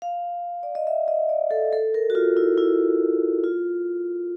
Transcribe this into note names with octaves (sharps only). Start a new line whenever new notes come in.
F5
D5
D#5
E5
D#5
D5
A4
A4
A#4
F#4
F4
E4
E4
F4